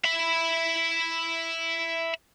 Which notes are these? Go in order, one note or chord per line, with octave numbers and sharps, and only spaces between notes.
E5 B5